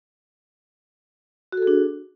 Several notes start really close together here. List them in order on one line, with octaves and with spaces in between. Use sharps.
F#4 A4 G#4 D4